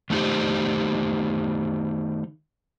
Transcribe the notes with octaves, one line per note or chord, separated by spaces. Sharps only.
D#3 A3 D#4 G4 C5